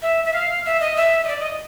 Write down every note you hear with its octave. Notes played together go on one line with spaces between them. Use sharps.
E5
E5
F5
E5
D#5
E5
D#5
D5
D#5